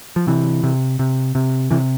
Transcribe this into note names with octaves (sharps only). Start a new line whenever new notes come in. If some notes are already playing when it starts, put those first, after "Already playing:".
F3
C3 E3
C3
C3
C3
C3 E3